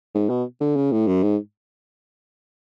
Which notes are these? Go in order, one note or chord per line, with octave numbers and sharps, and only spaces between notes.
G#2
B2
D3
C#3
A2
F#2
G#2